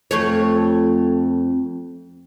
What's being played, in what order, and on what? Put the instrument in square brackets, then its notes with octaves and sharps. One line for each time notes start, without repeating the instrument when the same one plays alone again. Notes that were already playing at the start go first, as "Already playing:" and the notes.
[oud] F2 A3 C#5